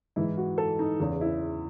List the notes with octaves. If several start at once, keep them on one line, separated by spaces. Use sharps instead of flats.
G#2 E3 E4
F#4
A4
D#4
E2 C#3 E3
E4